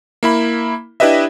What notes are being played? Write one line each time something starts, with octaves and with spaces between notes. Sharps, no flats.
A#3 E4 B5
D4 E4 G4 B4 D#5 E5